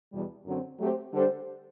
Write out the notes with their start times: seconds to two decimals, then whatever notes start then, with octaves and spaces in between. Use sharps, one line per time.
0.12 E2 B2 G3
0.46 F#2 D3 F#3 C4
0.79 F#3 A3 C4 G4 C5
1.13 D3 G3 D4 A4 C5